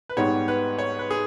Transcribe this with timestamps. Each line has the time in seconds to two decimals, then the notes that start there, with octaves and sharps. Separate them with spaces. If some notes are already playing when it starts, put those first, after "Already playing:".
0.09 B4
0.17 G#2 G3 B3 C#5
0.48 B4
0.78 C#5
0.99 B4
1.10 G#4